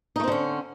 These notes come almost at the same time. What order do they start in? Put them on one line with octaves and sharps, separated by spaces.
D#4 A3 C4 D3 C#4